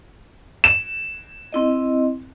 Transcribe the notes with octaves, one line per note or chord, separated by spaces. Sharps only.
E7
C4 E4 D#5